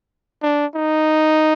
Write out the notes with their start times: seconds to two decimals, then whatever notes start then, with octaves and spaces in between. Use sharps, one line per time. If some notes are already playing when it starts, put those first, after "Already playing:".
0.42 D4
0.75 D#4